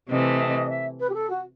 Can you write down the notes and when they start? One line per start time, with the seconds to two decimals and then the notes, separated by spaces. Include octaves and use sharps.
0.10 C3 E3 A3 C4 D#5
0.69 E5
0.99 B4
1.09 G4
1.13 A4
1.29 F#4